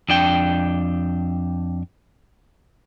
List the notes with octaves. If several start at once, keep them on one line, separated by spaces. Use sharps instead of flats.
F2 D4 G5